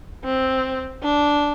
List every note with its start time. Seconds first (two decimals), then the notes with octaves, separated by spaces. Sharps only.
0.24 C4
1.03 D4